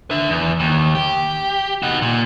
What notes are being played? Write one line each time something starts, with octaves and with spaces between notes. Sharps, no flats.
D4 E5
E2
D#2
G4
D#4 F#4
A#2